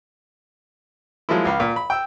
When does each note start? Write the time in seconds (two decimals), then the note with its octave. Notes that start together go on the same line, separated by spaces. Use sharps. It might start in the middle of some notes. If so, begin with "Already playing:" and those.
1.29 F3 F#3 G#3 A#3 E4
1.45 C#2 F5 B5
1.60 A#2
1.76 B5
1.90 G5 E6